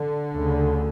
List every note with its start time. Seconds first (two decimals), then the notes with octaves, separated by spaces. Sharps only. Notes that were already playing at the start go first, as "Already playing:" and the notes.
Already playing: D3
0.33 D2 C#3